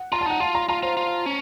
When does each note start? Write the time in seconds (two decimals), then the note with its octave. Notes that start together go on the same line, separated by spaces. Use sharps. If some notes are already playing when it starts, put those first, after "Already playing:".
Already playing: F#5
0.12 F4 A#5
0.21 A5
0.26 D#4 F#5
0.40 F4 A5
0.55 A#5
0.69 F4 A#5
0.83 F4 C5
0.97 F4
1.26 C#4